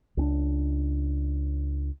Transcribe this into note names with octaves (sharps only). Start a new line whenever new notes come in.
C#2 C#4 D4